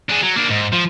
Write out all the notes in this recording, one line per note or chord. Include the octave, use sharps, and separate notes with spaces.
D4 G#4
F#3
A#3 D4
G#2
F3